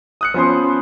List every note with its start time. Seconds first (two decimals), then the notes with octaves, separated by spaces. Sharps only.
0.21 D#6 F#6 C#7
0.34 F3 B3 C#4 C5 C6